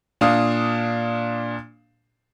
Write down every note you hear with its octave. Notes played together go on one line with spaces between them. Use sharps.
A#2 D4 F5 D#6